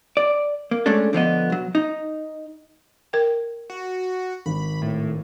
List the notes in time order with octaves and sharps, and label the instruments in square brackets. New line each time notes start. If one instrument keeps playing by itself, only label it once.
[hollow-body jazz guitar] D5
A#3
G#3 A3 C#4 D4 A4
D3 F3 B3 D#5
B1 F#3
D#4
[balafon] A#4 G5
[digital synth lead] F#4
[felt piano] G#1 [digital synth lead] B5
[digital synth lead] A2